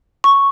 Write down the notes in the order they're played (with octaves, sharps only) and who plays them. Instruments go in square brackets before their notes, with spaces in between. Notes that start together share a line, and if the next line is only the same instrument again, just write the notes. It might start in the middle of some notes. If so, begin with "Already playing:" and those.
[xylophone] C#6